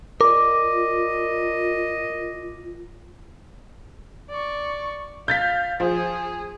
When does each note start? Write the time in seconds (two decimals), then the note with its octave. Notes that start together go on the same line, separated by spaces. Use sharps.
0.21 F4 A#4 D5 D#5 D6
4.30 D5 C#6
5.28 F5 G6 A6 B6
5.80 F3 G#4 C5